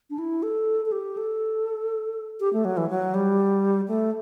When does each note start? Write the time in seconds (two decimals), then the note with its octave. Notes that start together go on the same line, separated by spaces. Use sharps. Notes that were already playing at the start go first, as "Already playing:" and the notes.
0.10 D4
0.19 E4
0.43 A4
0.86 A4
0.92 G4
1.17 A4
2.40 G4
2.53 A3
2.65 F#3
2.77 E3
2.90 F#3
3.14 G3
3.88 A3